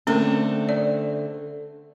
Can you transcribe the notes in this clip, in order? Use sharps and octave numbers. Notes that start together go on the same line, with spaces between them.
D3 A3 C4 C#4 A#4
D5